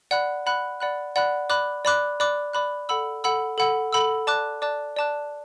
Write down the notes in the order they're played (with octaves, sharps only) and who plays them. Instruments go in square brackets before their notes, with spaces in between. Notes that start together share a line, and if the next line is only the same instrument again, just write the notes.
[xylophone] D5 F#5 B5 F#6
D5 F#5 B5 F#6
D5 F#5 B5 F#6
D5 F#5 B5 F#6
D5 B5 D6 F#6
D5 B5 D6 F#6
D5 B5 D6 F#6
D5 B5 D6 F#6
A4 F#5 B5 E6
A4 F#5 B5 E6
A4 F#5 B5 E6
A4 F#5 B5 E6
D5 A5 D6 F#6
D5 A5 D6 F#6
D5 A5 D6 F#6